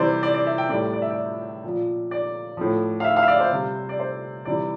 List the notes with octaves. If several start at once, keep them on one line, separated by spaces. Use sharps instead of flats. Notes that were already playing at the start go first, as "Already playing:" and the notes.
Already playing: C3 E3 G3 C5 D5
D5
D5
E5
G5
A2 G3 D5
D5
E5
D5
A#2 F3
D5
A2 F3
F5
E5
F5
E5
D5
C5
C3 G3
D5
C5
C3 E3 G3 D5